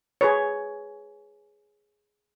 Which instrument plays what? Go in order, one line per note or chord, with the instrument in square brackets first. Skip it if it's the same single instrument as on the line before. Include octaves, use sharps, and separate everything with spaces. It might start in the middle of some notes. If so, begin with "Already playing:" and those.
[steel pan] G#4 B4 C#5